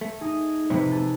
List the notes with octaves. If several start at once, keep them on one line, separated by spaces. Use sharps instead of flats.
A3
D#4 G#4 D#6
F2 A2 C3 E3 B4
G#4 A4